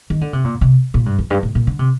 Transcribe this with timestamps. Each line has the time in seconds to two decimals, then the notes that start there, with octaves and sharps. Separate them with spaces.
0.10 D#3
0.21 D3
0.33 C3
0.44 A#2
0.61 C3
0.94 A#2
1.06 G2
1.18 F2
1.30 G2
1.43 A2
1.55 A#2
1.67 D3
1.79 C3